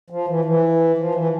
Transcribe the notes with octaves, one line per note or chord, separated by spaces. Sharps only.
F3
E3
E3
F3
E3